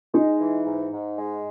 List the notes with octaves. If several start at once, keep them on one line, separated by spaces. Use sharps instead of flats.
G#3 D#4
E3
G#2
G#2
G#3